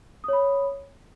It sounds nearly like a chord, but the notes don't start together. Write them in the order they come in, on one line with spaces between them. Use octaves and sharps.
D#6 C#5 B5